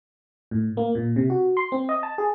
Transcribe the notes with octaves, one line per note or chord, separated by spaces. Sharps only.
A2
A#3
A#2
C3
F#4
C6
C4
D#5
A5
G#4